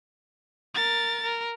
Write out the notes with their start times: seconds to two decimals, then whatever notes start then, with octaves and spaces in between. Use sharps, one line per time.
0.74 A#4 A6
1.23 A#4